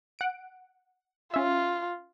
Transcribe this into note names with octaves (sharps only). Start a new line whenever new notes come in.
F#5 D7
C#4 F4 E5